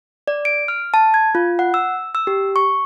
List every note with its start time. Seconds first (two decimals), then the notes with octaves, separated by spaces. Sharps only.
0.28 D5
0.45 D7
0.68 F6
0.94 A5
1.14 G#6
1.35 F4
1.59 F#5
1.74 E6
2.15 E6
2.27 G4
2.56 C#6